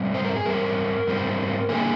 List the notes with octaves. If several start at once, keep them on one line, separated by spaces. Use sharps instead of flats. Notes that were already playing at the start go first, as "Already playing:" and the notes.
Already playing: G#2 G3 C4
C5
A#4
G#4
G#2 G3 C4 A#4
G#2 G3 C4
D3 G3 A#3 G#4